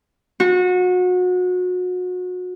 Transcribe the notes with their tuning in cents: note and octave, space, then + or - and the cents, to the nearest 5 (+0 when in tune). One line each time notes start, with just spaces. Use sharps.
F#4 -30